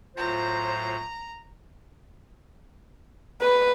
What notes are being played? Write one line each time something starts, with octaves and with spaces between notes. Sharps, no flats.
A2 F#3 F4 C5 A#5
B4